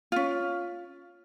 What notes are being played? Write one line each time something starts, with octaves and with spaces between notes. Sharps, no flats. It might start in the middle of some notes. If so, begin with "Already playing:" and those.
C#4 F4